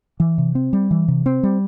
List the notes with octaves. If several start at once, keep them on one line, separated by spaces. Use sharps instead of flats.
E3
C3
C4
G3
E3
C3
C4
G3